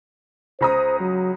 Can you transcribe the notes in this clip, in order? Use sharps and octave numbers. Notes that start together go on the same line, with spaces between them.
C#2 C5 A#5 D#6
F#3